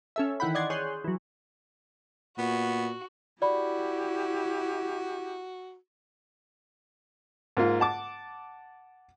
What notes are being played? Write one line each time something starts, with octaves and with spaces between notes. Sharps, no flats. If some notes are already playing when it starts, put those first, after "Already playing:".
C#4 A4 E5
D#3 E3 E4 F#5 G5 B5
D5 D#5 F#5 C6 G#6 A6
G#4 C#5 C6 D#6 F#6 G6
E3 F#3
A#2 B3 F#4
E4 F#4 G4 D5 B5
G#2 A#3 F4
F#5 A5 D6